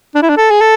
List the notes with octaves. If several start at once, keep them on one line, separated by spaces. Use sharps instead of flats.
D4
E4
D4
A4
G#4
A4